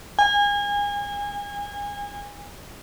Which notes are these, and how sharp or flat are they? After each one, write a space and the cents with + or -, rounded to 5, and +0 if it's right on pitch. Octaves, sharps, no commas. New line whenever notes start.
G#5 -30